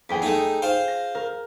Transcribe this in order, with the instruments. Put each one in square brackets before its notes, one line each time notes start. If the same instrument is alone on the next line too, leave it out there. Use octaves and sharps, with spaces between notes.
[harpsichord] E2 [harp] G#4 G5 B6
[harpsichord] A3 D#4
F4 C5
[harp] A#6
A#4